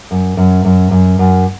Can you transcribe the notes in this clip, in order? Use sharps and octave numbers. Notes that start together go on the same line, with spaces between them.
F#2
F#2
F#2
F#2
F#2